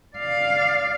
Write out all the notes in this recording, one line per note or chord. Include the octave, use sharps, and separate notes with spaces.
D5 F5